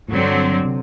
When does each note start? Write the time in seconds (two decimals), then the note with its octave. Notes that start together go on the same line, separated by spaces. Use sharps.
0.08 A2
0.12 G2 D3 F#3 C4
0.65 C3